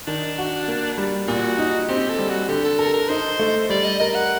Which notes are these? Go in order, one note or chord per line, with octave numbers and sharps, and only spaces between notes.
D#3 D4
F#4
A#3
G3
A#2 F#4
D#4
C4 G4
A4
G3
F#4
D3 G4
A4
A4 A#4
A#4
D#4 C5
A3
G3 D5
D#5
A#4 D#5
F#5